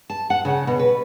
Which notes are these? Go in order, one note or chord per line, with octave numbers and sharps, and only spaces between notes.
A5
F#5
C#3
B2
B4